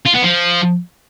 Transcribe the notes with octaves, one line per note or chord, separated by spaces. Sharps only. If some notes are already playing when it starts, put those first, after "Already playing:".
F4
B3
F3